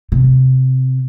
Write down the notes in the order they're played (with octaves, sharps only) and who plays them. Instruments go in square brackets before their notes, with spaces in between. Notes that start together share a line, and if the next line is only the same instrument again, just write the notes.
[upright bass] C3